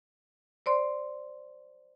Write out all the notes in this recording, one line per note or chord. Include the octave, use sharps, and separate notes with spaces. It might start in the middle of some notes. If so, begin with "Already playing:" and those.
C5 D5 C6